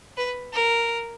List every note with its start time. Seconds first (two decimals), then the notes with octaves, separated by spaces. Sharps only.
0.17 B4
0.53 A#4